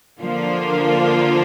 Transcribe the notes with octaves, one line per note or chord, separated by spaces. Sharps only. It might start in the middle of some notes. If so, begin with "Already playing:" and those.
D3 F3 A#3 D4 F4